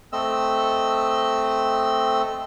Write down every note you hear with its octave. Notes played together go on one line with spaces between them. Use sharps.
A3 C4 D#5 E6